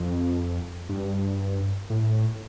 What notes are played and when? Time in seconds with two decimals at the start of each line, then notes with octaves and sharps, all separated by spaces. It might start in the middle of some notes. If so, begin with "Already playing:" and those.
Already playing: F2
0.89 G2
1.90 A2